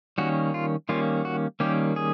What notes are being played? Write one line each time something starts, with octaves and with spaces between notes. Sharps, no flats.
D#3 G3 A#3 C#4 F#4
F4
D#3 G3 A#3 C#4 F4
F#4
D#3 G3 A#3 C#4 G4
G#4